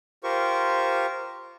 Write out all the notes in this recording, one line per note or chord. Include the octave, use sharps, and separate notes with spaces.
F4 G4 A#4 C5 C#6